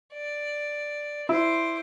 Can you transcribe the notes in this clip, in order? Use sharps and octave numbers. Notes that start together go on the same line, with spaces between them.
D5
E4 C5 D6